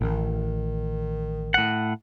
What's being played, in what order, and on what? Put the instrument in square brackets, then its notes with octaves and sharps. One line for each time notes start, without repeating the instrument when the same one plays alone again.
[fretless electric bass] A1 [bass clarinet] D#3
[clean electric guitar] A2 F#5